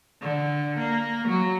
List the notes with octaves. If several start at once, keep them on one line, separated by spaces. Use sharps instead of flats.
D3
A#3
F#3